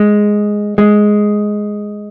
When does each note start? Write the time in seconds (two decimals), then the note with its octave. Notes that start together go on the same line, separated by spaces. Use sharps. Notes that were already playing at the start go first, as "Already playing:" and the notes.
Already playing: G#3
0.78 G#3